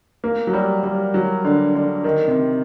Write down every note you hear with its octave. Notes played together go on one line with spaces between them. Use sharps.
A#3
F#3
G3
G3
F#3
D3
D3
D#3
C3